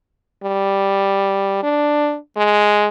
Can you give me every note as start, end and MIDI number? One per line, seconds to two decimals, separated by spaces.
0.43 1.63 55
1.63 2.17 62
2.37 2.88 56